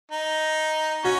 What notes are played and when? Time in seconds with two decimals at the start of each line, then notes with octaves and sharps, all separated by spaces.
0.12 D#4
1.04 C#4 F#4